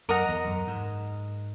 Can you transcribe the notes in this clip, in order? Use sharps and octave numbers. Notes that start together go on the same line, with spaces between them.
F#2 A#4 D#5 F#5 A#5
E2
F#2
G#2